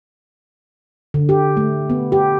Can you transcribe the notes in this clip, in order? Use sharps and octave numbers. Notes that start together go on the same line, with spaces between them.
D3
G4
A3
B3
G4